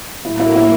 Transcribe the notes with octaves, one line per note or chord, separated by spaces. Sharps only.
A2 F#3 A#3 E4
E4
E4